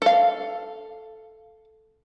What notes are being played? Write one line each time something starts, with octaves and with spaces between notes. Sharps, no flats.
A4 F5